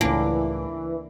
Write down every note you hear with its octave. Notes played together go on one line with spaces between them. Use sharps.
C#2 A2 E3 A#3 D4